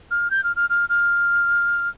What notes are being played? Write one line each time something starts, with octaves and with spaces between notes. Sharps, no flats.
F6
G6
F6
F6
F6
F6